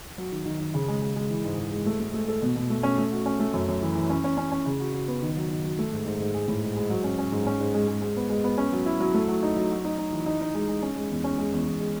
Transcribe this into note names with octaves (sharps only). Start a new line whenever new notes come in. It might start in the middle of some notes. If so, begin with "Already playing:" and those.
F#3
D#3
D#3
D#3
C#3
G#3
G#3
G#3
E3
G#2
E3
G#3
A3
A3
A3
A4
B2
B2
A3
C#4
A3
F#4
C#4
A3
F#2
F#2
E3
E3
C#4
C#4
C#4
C#4
C#3
F#4
F#4
B3
D#3
F#3
D#3
F#3
A3
G#2
G#2
G#2
G#4
A2
G#3
G#3
F#3
C#4
C#4
G#2
C#4
G#2
G#3
G#3
G#3
B3
G#3
B3
C#4
F#3
E4
F#3
A3
F#3
D#4
F#3
F#4
D#4
D#4
E3
D#4
D#4
G#3
G#3
C#4
G#3
E2
C#4
G#3
E2
E2
G#3